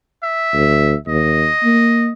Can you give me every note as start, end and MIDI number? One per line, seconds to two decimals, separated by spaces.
0.24 0.97 76
0.54 0.94 38
1.08 1.47 39
1.08 2.11 75
1.64 2.11 58